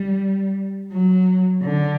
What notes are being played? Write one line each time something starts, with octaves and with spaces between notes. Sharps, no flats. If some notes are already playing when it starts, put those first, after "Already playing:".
Already playing: G3
F#3
D3